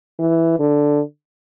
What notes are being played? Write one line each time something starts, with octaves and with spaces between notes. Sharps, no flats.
E3
D3